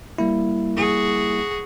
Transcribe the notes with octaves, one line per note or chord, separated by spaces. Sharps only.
G3 A#3 E4
F#4 G#4